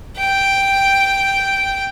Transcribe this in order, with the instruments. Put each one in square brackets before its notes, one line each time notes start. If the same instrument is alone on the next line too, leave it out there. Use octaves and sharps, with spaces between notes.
[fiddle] G5